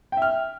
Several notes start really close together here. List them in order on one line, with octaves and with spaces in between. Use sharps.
G5 E5 F6